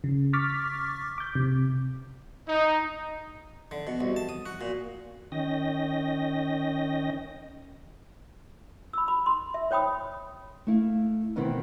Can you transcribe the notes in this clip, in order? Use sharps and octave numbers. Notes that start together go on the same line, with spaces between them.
C#3
C#6 D6 F6 A6 B6
D6 G6
C3
D#4
D3
B2
C2
A5
D#6
F#4
A#2
D#3 C#4 D#5 G5 A#6
B5 E6
B5
C6
E5
C5 C#5 G5 B5 D#6
A3 E4 F5
B2 D#3 E3 C4 E4